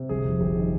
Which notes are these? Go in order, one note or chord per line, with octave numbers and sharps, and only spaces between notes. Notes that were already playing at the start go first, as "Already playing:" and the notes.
Already playing: C3
G1 G#4
F2
G1 G4
D#3